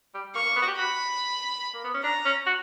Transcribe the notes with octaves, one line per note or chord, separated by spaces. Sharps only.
G3
A#3 C#6
A#3
B3
F#4
G4
F#4 B5
A#3
B3
C#4
D4 A#5
C#4
F#4